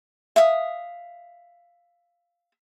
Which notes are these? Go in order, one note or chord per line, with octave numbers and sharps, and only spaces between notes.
E5 F5 D#6